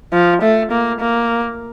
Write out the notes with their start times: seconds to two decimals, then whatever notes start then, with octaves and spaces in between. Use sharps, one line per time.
0.13 F3
0.42 A3
0.71 A#3
1.00 A#3